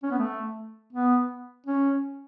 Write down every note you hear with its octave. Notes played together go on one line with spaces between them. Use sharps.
C#4
B3
A3
B3
C#4